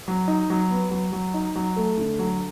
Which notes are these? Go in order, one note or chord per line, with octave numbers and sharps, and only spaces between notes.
F#3
D#4
F#3
B3
F#3
F#3
D#4
F#3
A3
D3
F#3